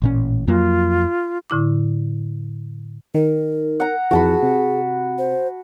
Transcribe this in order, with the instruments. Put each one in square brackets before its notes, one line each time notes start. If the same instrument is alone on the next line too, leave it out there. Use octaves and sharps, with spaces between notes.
[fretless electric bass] A1 A#2 C#4
[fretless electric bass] F2 F#3 A#3 [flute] F4
[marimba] A2 D3 E4 D6
[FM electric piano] D#3 [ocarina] A#4
[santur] F#5 A#5
[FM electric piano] F2 E3 [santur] F#4 A5 B5 [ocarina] G#4
[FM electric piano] C3
[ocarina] C5